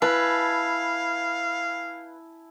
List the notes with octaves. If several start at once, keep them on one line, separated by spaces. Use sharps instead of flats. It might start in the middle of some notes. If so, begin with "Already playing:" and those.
E4 B4 F5 G#5 A5